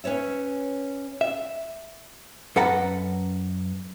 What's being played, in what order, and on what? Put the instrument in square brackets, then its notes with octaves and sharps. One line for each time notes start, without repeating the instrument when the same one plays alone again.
[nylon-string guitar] C#4 B4 C#5 E5
[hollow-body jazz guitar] E5
F#2 A4 B4 F#5 A#5